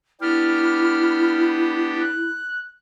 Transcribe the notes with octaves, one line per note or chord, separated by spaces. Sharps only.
B3 D4 E4 G4 F6
F#6